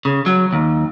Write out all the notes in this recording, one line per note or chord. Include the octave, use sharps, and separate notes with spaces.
C#3
F#3
D#2